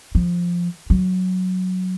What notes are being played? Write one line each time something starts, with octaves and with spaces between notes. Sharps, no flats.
F3
F#3